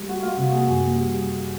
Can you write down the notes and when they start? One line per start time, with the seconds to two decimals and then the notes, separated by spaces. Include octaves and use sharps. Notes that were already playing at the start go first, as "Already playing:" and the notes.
Already playing: G3
0.08 A3 F#4
0.23 A3 F4
0.37 C3 F#4
0.51 A#3 G#4
0.66 F#2
0.80 A#3
0.94 G3
1.09 G3